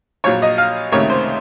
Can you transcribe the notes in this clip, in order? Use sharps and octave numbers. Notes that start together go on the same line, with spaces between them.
A#1 A#2 F#3 C#5
D#5
F5
C#2 C3 D#3 A3 C#5
C5